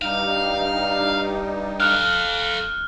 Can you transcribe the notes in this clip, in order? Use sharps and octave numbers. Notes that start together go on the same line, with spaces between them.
G2 G3 D#4 F5
A4 F5 F6 F#6